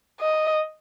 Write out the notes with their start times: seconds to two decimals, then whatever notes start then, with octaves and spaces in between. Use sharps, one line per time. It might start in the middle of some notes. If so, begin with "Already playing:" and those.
0.20 D#5